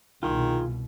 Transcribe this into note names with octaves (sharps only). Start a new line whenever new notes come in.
C2 B2 D#3 F4 G#4 C6